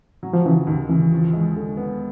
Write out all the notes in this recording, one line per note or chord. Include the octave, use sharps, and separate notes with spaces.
F#3
F3
C#3 E3
D#2 D#3
C#3 E3
F3
G#3
D3
B3